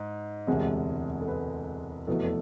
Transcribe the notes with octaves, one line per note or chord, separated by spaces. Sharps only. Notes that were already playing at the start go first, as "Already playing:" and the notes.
Already playing: G#2
E1 D2 C3 G#3
A4
B4
F1 E2 B2 A3 A4
A4